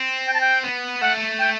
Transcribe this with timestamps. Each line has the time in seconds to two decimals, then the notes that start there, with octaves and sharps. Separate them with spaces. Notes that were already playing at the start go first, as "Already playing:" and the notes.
Already playing: C4
0.27 G5
0.34 A5
0.41 G5
0.63 B3
1.01 A3 F#5
1.39 G5